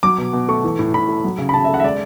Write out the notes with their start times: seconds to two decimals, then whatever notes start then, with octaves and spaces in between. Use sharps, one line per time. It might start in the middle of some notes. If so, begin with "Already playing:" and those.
0.03 F#3 D6
0.18 B2
0.33 B2
0.49 A3 C#6
0.64 E3
0.79 A2
0.94 A2 B5
1.09 A3
1.25 F#3
1.38 C#3
1.49 B5
1.54 C#3 A5
1.64 E5
1.69 A3
1.74 F#5
1.80 E5
1.84 G#3 D5